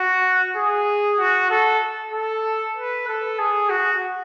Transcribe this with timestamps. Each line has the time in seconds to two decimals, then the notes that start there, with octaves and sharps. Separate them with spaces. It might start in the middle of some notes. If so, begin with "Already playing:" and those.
Already playing: F#4
0.56 G#4
1.19 F#4
1.50 A4
2.13 A4
2.76 B4
3.08 A4
3.39 G#4
3.70 F#4